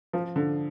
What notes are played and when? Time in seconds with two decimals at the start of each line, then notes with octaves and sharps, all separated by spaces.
0.13 F3
0.36 D3